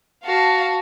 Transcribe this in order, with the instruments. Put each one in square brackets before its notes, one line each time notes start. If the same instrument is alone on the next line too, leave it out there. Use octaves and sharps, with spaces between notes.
[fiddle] F#4 [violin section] F5 A5